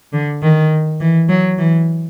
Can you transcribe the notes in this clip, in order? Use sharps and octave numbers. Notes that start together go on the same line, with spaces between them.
D3
D#3
E3
F#3
E3